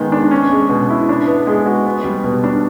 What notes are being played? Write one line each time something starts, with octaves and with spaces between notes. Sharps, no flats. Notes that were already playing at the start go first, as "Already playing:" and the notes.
Already playing: D#3 G#3 B3
D4
C#4
G#3
B2
E4
D4
B3
G#3
F#4
B3
G3
B2
D4